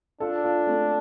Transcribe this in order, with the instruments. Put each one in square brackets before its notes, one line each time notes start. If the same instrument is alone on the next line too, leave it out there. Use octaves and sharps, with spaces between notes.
[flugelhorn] D4 [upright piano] F4 A4
[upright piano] F4 A4
A3 C4